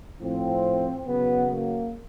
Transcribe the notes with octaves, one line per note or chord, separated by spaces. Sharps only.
A2 F3 C4
C#3 F#3 B3
A#3